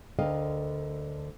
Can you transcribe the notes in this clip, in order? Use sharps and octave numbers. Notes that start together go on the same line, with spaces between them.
D2 D3 A#4 D#5 F5 G5